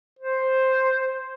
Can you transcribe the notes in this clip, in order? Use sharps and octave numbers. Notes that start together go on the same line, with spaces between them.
C5